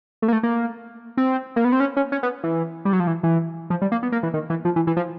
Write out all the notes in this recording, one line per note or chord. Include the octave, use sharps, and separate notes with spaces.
A3
A#3
A3
A#3
C4
A#3
B3
C4
C#4
C#4
C#4
B3
E3
G3
F#3
F3
E3
E3
F3
G3
A#3
B3
A#3
E3
D#3
E3
F3
E3
E3
F3